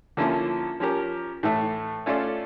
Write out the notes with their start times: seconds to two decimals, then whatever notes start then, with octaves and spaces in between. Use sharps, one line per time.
0.17 D3 F3 A#3 C#4 E4
0.80 F3 C#4 G4 A#4
1.43 A2 E3 A3
2.06 A3 C#4 F4 A4 D5